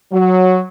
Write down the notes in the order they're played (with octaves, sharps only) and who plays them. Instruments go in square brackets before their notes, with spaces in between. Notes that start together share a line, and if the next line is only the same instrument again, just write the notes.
[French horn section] F#3